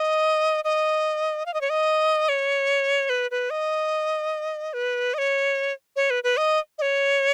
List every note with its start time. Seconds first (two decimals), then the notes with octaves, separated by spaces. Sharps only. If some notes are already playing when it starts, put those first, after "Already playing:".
Already playing: D#5
0.64 D#5
1.46 F5
1.54 D#5
1.61 C#5
1.70 D#5
2.29 C#5
3.09 B4
3.31 B4
3.50 D#5
4.73 B4
5.14 D#5
5.18 C#5
5.96 C#5
6.10 B4
6.24 B4
6.37 D#5
6.78 D#5
6.82 C#5